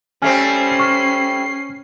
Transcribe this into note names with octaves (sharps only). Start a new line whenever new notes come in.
G3 A3 C4 C#4 G#5 F6 C7
C#6 F6